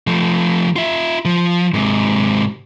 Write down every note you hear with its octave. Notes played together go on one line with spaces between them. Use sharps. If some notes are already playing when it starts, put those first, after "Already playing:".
F3 A3
F4 E5
F3
G#2 C3